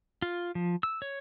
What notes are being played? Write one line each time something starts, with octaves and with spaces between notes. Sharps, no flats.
F4
F3
E6
C#5